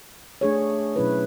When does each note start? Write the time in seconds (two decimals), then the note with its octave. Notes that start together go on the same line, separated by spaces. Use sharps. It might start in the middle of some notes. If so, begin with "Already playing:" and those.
0.41 A3 D4 G#4 C#5
0.96 B2 F#3 C#4 E4 B4